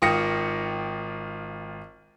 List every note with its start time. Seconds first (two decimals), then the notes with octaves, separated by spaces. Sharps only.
0.02 G#1 F4 G5 D#6 A#6 C#7